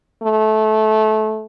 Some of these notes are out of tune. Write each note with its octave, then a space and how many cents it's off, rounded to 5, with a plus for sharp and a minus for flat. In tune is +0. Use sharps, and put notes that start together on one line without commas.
A3 -20